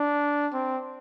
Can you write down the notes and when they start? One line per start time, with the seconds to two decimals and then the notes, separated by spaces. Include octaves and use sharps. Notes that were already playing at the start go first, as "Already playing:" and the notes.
Already playing: D4
0.53 C4